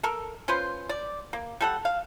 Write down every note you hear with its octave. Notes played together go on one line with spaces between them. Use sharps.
A4 A#4
C#4 F4 B4 C5
D5
A#3
G3 A4 F#5
F5